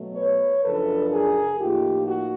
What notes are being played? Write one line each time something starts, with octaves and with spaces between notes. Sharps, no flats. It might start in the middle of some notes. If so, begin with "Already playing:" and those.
Already playing: B2 F#3 A3
B4 C#5
F#2 C#3 F3 A3 D4 A4 B4
G#4 A#4
A2 F3 A#3 D#4 F4 G4
F#4